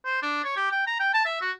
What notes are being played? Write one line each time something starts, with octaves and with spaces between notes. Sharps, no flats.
C5
D4
C#5
G4
G5
A#5
G5
A5
E5
F#4